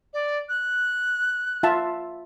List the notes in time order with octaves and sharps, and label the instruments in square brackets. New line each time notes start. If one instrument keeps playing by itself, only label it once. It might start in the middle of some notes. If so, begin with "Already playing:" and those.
[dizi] D5
F#6
[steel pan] F4 E5 A5